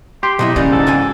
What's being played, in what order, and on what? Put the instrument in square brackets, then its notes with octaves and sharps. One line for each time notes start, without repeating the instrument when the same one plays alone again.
[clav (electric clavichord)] G4 [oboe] C6
[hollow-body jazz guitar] B2 F#3 E4 [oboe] D#4
[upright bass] C#3 [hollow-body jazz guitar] E3 G3 A#3
[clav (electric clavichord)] G#2 [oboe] A4
[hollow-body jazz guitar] F#4 G5 G#5